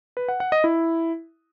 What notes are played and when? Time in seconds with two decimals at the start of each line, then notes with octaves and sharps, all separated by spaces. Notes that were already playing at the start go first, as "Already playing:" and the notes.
0.17 B4
0.29 F#5
0.40 F#5
0.52 D#5
0.64 E4